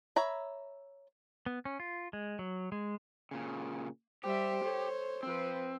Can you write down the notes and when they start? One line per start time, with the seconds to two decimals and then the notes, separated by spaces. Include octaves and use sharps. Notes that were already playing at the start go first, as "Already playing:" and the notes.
0.16 C#5 E5 A#5 B5
1.46 B3
1.65 C#4
1.80 F4
2.13 G#3
2.39 F#3
2.72 G#3
3.31 A#2 C#3
4.24 G3 G4 C5 E5
4.64 A4 C#5
5.23 F3 C4 B4